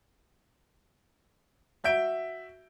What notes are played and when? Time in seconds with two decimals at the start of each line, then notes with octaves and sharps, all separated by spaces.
1.84 F#4 E5 G6 D7